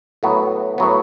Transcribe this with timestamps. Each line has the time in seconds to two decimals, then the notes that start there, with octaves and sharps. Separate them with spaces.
0.23 A2 F#3 B3
0.78 A2 F#3 B3